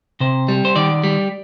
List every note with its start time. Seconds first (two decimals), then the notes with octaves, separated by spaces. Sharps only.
0.20 C3 C5
0.48 G3
0.65 C5
0.76 D#3 D5
1.04 G3